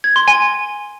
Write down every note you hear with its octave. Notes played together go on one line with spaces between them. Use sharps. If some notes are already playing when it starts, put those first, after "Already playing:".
G#6
C6
G#5